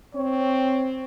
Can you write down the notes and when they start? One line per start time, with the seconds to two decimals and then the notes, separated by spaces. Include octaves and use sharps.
0.15 C4 C#5